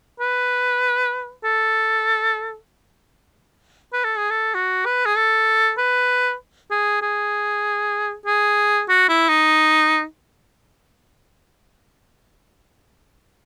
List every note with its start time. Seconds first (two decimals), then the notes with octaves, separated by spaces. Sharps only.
0.20 B4
1.44 A4
3.93 B4
4.04 A4
4.17 G#4
4.30 A4
4.54 F#4
4.85 B4
5.05 G#4
5.16 A4
5.78 B4
6.71 G#4
7.02 G#4
8.26 G#4
8.89 F#4
9.08 E4
9.29 D#4